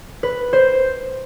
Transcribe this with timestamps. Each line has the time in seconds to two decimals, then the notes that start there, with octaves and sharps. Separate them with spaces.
0.23 B4
0.53 C5